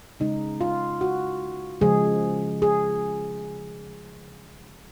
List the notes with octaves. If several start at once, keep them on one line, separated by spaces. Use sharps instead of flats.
C#3 G#3 D#4
F4
F#4
C#3 F3 G#3 G#4
G#4